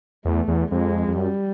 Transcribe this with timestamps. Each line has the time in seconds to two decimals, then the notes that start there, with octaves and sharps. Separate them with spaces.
0.25 E2 A3
0.48 E2
0.71 F2 G#3
1.08 F2
1.17 F#2 G3